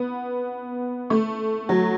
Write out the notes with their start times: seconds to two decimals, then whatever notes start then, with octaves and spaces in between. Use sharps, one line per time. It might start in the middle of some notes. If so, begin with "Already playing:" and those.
Already playing: B3
1.10 A3
1.69 F#3